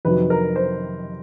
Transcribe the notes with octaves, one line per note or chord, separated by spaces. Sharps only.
F2 C3 D#3 F#3 B4
A#4
C5